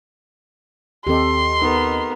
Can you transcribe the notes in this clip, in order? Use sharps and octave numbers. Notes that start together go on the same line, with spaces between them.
D#2 C4 G4 A4 D#5 C6
B3 D#4 A4 A#4